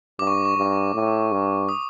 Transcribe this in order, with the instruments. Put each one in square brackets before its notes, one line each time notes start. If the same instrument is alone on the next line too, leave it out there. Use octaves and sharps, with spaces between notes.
[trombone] G2 [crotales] D6
[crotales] C#6
C#6
[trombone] G2
A2
G2
[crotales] D#6